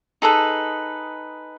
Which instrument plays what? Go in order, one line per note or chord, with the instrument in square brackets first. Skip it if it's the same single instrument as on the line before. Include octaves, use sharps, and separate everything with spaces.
[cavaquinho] D#4 G#4 A4 B4